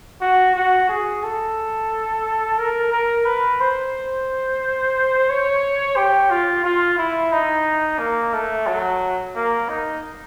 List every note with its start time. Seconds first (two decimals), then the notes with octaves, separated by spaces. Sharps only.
0.22 F#4
0.55 F#4
0.89 G#4
1.23 A4
2.58 A#4
2.92 A#4
3.25 B4
3.60 C5
5.29 C#5
5.97 G4
6.30 F4
6.64 F4
6.98 E4
7.32 D#4
7.99 A#3
8.33 A3
8.67 F#3
9.35 A#3
9.69 D#4